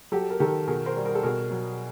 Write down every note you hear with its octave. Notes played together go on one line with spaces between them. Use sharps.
F#3 G4 A4
A#4
D#3 G4 A4
B2 G#4 A#4
A#4 C5
G3
A#4
A4
B2 G#4 A#4
F#3